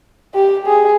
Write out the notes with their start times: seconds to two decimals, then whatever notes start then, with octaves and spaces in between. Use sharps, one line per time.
0.34 G4
0.67 G#4